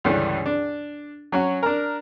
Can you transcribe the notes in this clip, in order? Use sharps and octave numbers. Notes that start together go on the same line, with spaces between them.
C#2 G2 D3 E3 G3 C#4
D4
F#3 C#4 F#4
D4 A#4